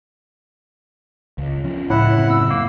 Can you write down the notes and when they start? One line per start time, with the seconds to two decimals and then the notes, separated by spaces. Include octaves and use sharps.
1.38 C#2
1.64 F3 C#4
1.90 C#2 A2 E4 F#5
2.17 F#2 C#3 C4
2.30 E6
2.51 A#3